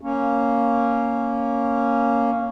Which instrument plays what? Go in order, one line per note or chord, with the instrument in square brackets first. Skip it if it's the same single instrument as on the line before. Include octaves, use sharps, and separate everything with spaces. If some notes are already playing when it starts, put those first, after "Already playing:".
[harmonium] A#3 C#4